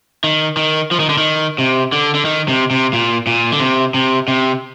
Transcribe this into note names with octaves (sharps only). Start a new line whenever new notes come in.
D#3
D#3
F3
D#3
D3
D#3
C3
D3
D3
D#3
C3
C3
A#2
A#2
D3
C3
C3
C3